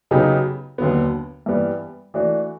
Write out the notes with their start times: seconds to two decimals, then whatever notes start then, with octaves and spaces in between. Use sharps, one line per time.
0.11 C#3 F#3 B3 D#4 G4
0.78 D#2 D3 F#3 B3
1.46 G2 E3 G3 B3
2.14 E3 A3 D4 F#4